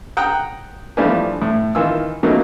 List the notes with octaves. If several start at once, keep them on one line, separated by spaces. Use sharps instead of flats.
F#5 G5 A#5 D#6 F#6
E3 F3 G3 A3 D4 F4
A2
D#3 E3 F4 E6
C#3 F#3 A3 A#3 D#4